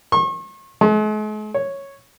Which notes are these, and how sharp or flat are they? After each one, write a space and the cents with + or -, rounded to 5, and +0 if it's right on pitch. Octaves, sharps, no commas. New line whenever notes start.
C#6 -40
G#3 +45
C#5 -5